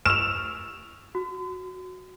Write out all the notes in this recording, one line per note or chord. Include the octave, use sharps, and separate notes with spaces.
C#6 E6 F6 E7 F7
F#4